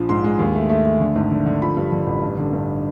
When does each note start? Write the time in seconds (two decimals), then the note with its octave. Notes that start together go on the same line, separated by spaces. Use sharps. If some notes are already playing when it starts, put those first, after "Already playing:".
Already playing: A#1 F3
0.09 G#2 C6
0.24 G#3
0.39 D#2
0.55 A3
0.69 A3
0.85 A3
1.00 D3
1.15 G#1
1.31 D3
1.46 D3
1.62 F3 B5
1.77 G2
1.92 D3
2.07 A1
2.22 G2
2.38 D3
2.53 G2